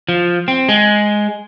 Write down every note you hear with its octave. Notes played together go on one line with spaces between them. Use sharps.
F3
C4
G#3